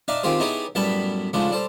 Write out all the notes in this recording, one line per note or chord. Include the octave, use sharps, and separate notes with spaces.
D4 D#4 E5 F5
D#3 C4 F4 G4 G#4 C5
B3 D#4 E4 G4 G#4 C#5
F#2 A2 G3 B3 A5 B5
G#2 C#3 F3 A3 D4
G3 A4 C5